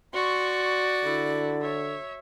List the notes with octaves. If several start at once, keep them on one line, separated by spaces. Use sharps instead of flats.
F#4 D5 C6 C#6
D3 E4
C#5 E5